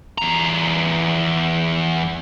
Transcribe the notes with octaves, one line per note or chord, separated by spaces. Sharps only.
E2 A#5